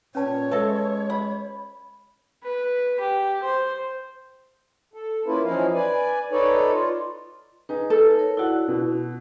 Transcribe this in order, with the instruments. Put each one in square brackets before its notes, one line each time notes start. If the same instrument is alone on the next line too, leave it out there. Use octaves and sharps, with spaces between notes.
[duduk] A#2 [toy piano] C#4 B4 A5 [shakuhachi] C#5
[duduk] G#3 [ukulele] A4 A5 [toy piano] B4 E5
[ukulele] B5
[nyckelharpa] B4
G4
C5
[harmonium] A4
A#3 C#4 E4 F4 B4
E3 F3 C#4 D#4 E4 F5
B4 D5 G#5
D#4 A4 B4 C#5 D5
F4
[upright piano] D#4 G#4 [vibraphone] B4
[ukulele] A4
[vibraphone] A#4 C#5
[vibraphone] E4 F#4 [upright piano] D5 F#5
[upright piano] B2